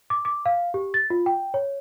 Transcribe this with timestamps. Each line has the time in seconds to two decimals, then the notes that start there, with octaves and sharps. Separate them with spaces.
0.10 D6
0.25 D6
0.46 F5
0.74 G4
0.94 A6
1.10 F4
1.26 G5
1.54 C#5